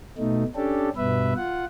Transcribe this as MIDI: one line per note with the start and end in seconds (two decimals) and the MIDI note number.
0.18 0.44 47
0.18 0.44 57
0.18 0.44 63
0.56 0.89 61
0.56 0.89 62
0.56 0.89 67
0.56 0.89 69
0.96 1.33 43
0.96 1.33 47
0.96 1.33 71
0.96 1.33 76
1.36 1.65 65
1.36 1.65 78